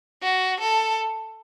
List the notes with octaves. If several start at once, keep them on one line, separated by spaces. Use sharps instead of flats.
F#4
A4